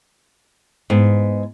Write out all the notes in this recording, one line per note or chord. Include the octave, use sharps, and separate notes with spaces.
G#2 B3